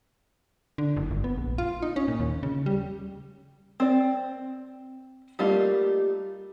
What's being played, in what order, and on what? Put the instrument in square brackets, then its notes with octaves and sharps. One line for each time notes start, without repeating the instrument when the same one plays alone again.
[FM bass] D3
F#1
G1
B3
A#1
F4
D#4
C#4
A#2
D#2
C#3
G3
[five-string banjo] C4 D5
G3 A3 A#3 D#4 F4